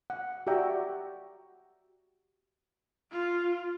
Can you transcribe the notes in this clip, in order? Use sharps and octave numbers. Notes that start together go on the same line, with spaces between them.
F#5
F#4 G4 D5 E5 G5 A#5
F4